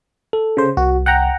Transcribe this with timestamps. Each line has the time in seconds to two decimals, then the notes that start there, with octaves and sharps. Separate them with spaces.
0.33 A4
0.57 C#3 C5
0.77 C2 F#4
1.06 F#5 G5 A#5